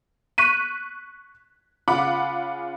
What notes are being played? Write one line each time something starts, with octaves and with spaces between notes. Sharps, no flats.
C#6 F#6 B6 D#7
C#3 F4 F#5 B5 D6